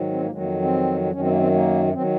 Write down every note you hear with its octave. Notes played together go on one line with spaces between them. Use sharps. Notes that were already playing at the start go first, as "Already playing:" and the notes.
Already playing: G#2 D#3 F#3
C4
A#3
F2 D#3 F#3 G#3
A#3
C4
F#2 D#3 F#3 C#4
C4
A#3
C4
A#3
D#3 F#3 C4